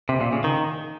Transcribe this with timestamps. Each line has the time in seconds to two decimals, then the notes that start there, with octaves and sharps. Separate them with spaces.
0.09 C3
0.21 A#2
0.32 C#3
0.44 D#3